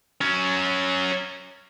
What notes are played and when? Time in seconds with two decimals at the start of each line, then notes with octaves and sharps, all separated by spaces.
0.21 F#3 C#4